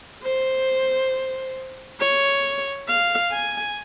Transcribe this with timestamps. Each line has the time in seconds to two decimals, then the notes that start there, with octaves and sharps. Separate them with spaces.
0.23 C5
2.00 C#5
2.88 F5
3.32 G#5